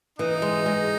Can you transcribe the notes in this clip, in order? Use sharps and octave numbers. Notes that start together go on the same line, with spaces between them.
E3 D#4
G#3
G#3